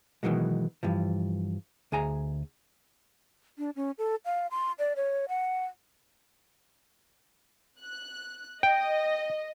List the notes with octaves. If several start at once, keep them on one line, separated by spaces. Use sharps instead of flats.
B2 D#3 E3 F#3 G#3
G2 E3 F3
D2 G#4 G#5 A#5
D4
C#4
A4
F5
C6
D5
C#5
F#5
F#6
D#5 G5